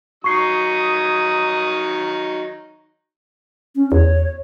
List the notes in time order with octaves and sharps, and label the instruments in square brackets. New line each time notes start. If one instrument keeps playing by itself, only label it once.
[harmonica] D#3 F#3 D#4 [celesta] C#6 C7 [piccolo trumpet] D#6
[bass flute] C#4
[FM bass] E2 [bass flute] C#5